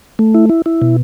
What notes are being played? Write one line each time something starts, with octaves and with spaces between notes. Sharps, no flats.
A3
E4
E4
E4
B2